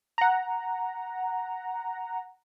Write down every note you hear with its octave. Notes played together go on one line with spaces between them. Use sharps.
F#5 A#5